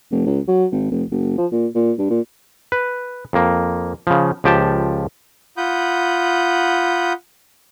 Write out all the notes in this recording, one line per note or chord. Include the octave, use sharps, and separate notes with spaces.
F1
C#2
F#3
G#1
F1
F#1
F3
A#2
A#2
G2
A#2
B4
F2 A#3
C#3 F3
C#2 F3 G4 G5 A5
F4 F#5 B5 D#6 G6